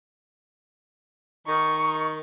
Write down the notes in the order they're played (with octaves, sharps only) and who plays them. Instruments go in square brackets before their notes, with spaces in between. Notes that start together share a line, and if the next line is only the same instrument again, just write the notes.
[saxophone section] D#3 [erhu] C#6